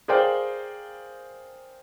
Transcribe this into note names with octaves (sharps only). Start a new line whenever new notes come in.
G#4 A#4 C5 D5 F5 G5